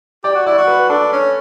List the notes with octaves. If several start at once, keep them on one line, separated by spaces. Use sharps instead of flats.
G4 D5
F#4
E4 D5
F#4
B4
D4 A4
C#4